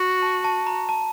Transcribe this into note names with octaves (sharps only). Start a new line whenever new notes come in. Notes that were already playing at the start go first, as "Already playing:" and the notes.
Already playing: F#4
A5
A5
A#5
A5